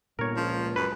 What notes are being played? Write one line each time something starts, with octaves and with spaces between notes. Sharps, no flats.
G1 A#2 A#3 A#4 C#5
C#2 F3
F#2 B4